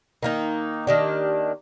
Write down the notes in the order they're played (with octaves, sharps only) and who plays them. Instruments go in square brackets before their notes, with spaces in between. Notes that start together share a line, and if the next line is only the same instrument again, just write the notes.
[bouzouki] D#3 A#3 D#4
D#3 A#3 D4 G4